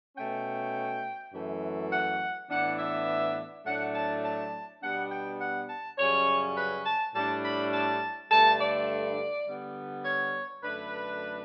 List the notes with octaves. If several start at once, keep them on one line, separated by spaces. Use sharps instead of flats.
B2 A3 C#4 G5
F#2 E3 A3
F#5
A2 E3 B3 D4 F#5
E5
A2 F#3 A3 D4 F#5
A5
A5
B2 G3 B3 D4 F#5
G5
F#5
A5
F#2 C#3 G3 C#4 C#5
B4
A5
A2 G3 D4 A5
B5
A5
G2 D3 A3 A5
D5
D3 G3 B3
C#5
F#2 D3 A3 D4 B4